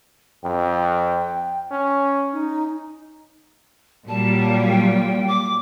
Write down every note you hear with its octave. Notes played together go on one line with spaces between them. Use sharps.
F2 G5
C#4
D#4
A#2 F#3 G3 A5
G5
D6